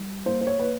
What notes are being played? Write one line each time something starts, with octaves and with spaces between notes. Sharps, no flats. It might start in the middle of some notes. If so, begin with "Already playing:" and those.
Already playing: G3
A#3 C5
C5
C#5
A#3 B4